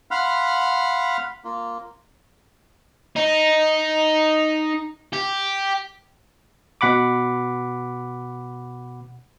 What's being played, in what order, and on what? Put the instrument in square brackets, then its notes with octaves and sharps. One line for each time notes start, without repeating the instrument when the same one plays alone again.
[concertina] F5 F#5 B5 C6 F6
A#3 F4
[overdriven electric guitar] D#4
G4
[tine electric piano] B2 F#5 B5 D6